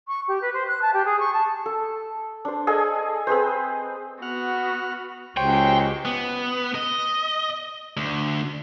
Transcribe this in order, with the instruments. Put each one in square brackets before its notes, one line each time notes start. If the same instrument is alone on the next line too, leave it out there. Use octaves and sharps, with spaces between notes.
[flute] C#6
G4
B4
C5
F#6
A5
G4
G#4
C#6
A5
[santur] A4
D4 C5
G#4 A4 D#5 G#5
C4 G#4 B4 C5
[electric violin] B3 F#4 [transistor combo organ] F#5 F6
[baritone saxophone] C#2 [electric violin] F#4 G4 [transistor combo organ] C5 C#5 [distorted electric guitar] G5
[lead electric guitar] B3
D#5
D2